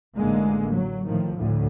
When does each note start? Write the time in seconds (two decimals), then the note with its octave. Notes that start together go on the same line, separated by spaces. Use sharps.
0.16 A1 D3 G#3 A#3
0.71 F#3
1.05 A2 D#3 F3
1.37 D2 A2 D3